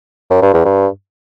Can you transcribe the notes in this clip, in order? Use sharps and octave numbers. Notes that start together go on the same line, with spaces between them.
F#2
G2
E2
G2